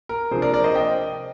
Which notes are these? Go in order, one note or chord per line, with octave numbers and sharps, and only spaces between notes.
A#4
C3 F3 A#3 D4 G#4 C5
A#4 D5
A#4 D5
C5 D#5
D#5 G5